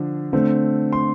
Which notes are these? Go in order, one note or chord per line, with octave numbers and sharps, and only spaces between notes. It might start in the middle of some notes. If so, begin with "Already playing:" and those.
Already playing: D3 F3 D4
D3 A3 C4
C6